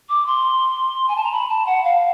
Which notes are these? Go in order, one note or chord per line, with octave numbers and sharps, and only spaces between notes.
D6
C6
G#5
A5
A#5
B5
A5
F#5
F5